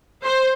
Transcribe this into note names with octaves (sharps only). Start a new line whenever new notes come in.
C5